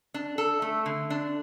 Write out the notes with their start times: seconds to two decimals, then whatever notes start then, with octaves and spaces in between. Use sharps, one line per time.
0.14 D4
0.38 A4
0.62 A3
0.86 D3
1.10 D4